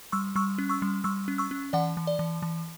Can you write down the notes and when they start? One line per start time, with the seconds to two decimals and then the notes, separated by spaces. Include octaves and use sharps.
0.12 G3 C#6 E6
0.36 G3 C#6 E6
0.58 C#4
0.69 C#6 E6
0.82 G3
1.04 G3 C#6 E6
1.28 C#4
1.38 C#6 E6
1.51 C#4
1.73 E3 D5 F#5
1.97 E3
2.07 D5
2.19 E3
2.42 E3